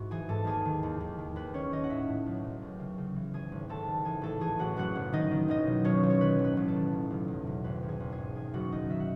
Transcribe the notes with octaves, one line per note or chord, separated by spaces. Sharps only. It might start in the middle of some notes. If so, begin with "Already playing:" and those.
Already playing: G#2 E4 F#4
E3 G#4 G#5
G#2 A4 A5
D#2 G#4 G#5
D#3
D#2
D#2
D#3
D#2 B4
D#2 C#4 C#5
D#3 D#4 D#5
F#5
A2 E4 E5
A2
B1
B1
D#2
C#3
C#3
E3
G#1 G#4 G#5
G#1
G#1 A4 A5
D#3
E3 G#4 G#5
A1 A4 A5
E3 G#4 G#5
A1 F#4 F#5
F#1 F#4 F#5
F#1
D#3 D#4 D#5
D#3
B1 D#4 D#5
B2
B1 C#4 C#5
B1
C#5
D#3 B4
A1
B4
A1
A4
D#3
F#1
F#1
E2
B2
G#1 B4
G#1
G#4 G#5
G#1
G#4 G#5
G#2
E2 G#4 G#5
F#1 F#4 F#5
D#3 D#4 D#5
D#3 E5
F#5